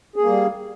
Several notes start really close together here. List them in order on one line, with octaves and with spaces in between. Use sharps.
G#4 A#3 G3